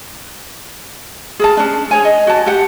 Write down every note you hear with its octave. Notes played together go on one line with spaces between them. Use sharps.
G#4 A#4 A5
C#4 D4
G#4 C#5 G#5
D#5
F#4 A5
G4 F#5